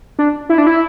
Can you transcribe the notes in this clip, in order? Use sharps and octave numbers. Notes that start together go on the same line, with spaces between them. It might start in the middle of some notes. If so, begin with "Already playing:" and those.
D4
E4
D4
E4